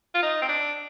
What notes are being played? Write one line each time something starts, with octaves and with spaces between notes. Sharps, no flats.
F4
D#4
C4
D4